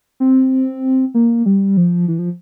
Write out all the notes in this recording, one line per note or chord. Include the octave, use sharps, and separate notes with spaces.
C4
A#3
G3
F3
E3
F3